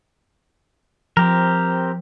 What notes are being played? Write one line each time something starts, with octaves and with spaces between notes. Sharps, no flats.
F3 C4 G4 A#4